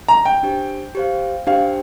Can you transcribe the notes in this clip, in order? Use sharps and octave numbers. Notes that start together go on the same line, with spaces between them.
A#5
G5
D4 G4 C5
G4 C5 F5
D4 G4 C5 F5 G5